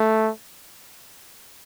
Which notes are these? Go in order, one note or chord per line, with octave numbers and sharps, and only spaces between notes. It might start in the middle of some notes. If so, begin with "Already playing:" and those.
Already playing: A3